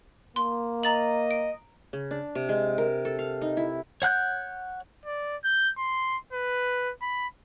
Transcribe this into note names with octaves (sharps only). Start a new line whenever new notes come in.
A#3 C6
D#5 A#5 A6 F#7
D7
C#3
D4
C3
G#3
A#4
A4
F5
D#4
E4
C#5 F#5 F#6 G6
D5
G6
C6
B4
B5